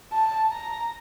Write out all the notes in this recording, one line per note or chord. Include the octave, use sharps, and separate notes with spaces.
A5
A#5